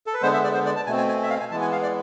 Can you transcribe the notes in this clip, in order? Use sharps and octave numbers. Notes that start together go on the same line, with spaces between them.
A4
B4
D3 G#3 B3 C5
E5
D5
C5
D5
A5
B2 A3 C4 G#5
G#5
G#5
E5
F5
G#5
E3 G#3 B3 A5
G#5
F5
D5